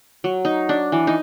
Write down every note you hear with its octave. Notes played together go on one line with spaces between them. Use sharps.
F#3
D#4
D4
E3
D#4